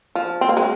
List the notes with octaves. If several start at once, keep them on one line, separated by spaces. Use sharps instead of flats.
F3
C4
A#3
G#3